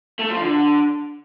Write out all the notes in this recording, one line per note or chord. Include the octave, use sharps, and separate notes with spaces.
A3
F3
D3